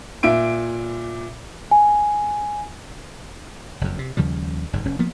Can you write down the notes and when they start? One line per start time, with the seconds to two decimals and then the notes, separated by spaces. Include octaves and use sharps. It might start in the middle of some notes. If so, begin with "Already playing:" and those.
0.23 A#2 E5 D7
1.71 G#5
3.81 F#1 F2
3.99 C3
4.17 D#2 C#3 F3 G3
4.73 F#1 G#2
4.85 F1 C#4
4.99 F3 A#3 B3